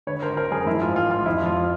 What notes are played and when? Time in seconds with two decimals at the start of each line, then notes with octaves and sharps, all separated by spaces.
0.07 D3 B4 C#5
0.22 G#1 A#4 C5
0.37 G#1 A#4 C5
0.51 F#2 G#4 A#4
0.66 F3 E4
0.81 G#2 F4
0.96 A1 F4
1.11 A1 F4
1.26 F2 E4
1.42 F2 F4